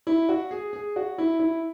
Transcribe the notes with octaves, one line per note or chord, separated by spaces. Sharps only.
E4
F#4
G#4
G#4
F#4
E4
E4